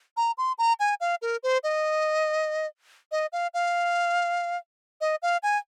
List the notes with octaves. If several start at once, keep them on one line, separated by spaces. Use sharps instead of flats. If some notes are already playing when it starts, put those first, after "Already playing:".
A#5
C6
A#5
G#5
F5
A#4
C5
D#5
D#5
F5
F5
D#5
F5
G#5